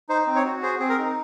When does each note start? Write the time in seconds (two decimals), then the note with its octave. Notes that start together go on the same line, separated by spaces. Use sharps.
0.09 D#4 C5
0.27 C4
0.35 C#5
0.45 F#4
0.62 G#4 C5
0.79 C4 G#4
0.89 A#4
0.98 D#4